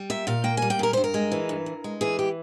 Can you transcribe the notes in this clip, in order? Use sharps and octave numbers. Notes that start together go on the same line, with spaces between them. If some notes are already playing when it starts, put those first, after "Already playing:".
Already playing: G3
A#2 E5
A#2 F5
A#3 G5
G3 G#5
G5
A#2 A#4
G2 C5
A#4
G#3
E3
G2
G2
G#3
E3 G#4
G4